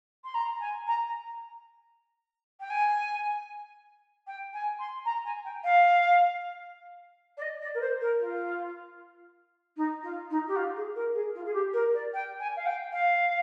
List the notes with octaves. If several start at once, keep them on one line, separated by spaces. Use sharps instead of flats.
C6
A#5
G#5
A#5
G5
G#5
G5
G#5
C6
A#5
G#5
G5
F5
D5
D#5
D5
A#4
C5
A#4
F4
D#4
F4
D#4
G4
F4
G#4
A#4
G#4
F4
G#4
G4
A#4
D5
G5
G#5
F5
G5
F5